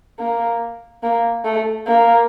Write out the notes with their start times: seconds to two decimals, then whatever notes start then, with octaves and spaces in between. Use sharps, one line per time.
0.19 A#3
1.03 A#3
1.45 A3
1.87 A#3